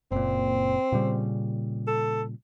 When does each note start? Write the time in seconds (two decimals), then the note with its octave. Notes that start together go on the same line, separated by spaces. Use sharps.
0.12 F#1 A#2 C4
0.92 A#2 C#3 G3
1.87 A4